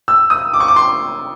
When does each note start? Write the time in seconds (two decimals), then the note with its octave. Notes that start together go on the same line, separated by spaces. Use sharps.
0.08 E6
0.30 D#6
0.54 D6
0.60 C#6
0.68 D6
0.76 C6